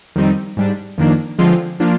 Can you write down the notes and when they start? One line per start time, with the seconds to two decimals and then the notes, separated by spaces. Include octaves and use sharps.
0.16 F2 D#3 G3 C4 D#4
0.57 G#2 G3 D4
0.98 F2 D#3 A#3 D4
1.39 D3 F3 G#3 C4 F4
1.80 F3 A#3 D4 F4